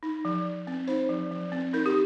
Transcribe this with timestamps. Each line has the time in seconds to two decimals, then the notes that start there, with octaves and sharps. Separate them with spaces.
0.03 D#4
0.25 F3
0.45 F3
0.67 C4
0.87 D#4 C5
1.09 F3
1.31 F3
1.52 C4
1.73 D#4 A#4
1.86 G4